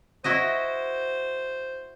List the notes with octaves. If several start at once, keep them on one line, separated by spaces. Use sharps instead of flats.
E4 F#4 C5 D#5